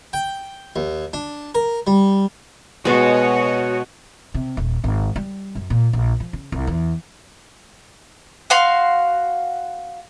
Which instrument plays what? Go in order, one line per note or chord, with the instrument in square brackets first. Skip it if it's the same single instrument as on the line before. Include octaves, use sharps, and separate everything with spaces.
[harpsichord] G5
D#2
D4
A#4
G3
[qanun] B2 G#3 [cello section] F#4 C#5 D#5
[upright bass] C3
D#1
G#1
G3
F#2
A#2
A#1
F3
C#3
C2
E2
[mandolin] F#4 F5 C6